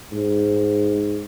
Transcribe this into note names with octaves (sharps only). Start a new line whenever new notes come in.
G#2